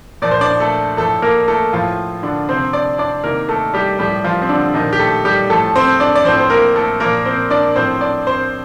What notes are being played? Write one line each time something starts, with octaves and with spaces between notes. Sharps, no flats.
A#2 F3 D5
C5
D4 D5
A3 A4
A2 F3 A3 A4
A#3 A#4
A3 A4
A2 F3 F4
D3 D4
C3 F3 C4 C5
D4 D5
D4 D5
C3 D#3 A#3 A#4
A3 A4
G3 G4
A2 F3 G3 G4
F3 F4
C4
D3 D4
A#2 D#3 F3 D#4
G4
A3 A4
G3 G4
A2 F3 A3 A4
C4 C5
D4 D5
D5
A2 F3 C4 C5
C5
A#3 A#4
A3 A4
A#2 F3 A#3 A#4
C4 C5
D4 D5
A2 F3 C4 C5
D4 D5
C4 C5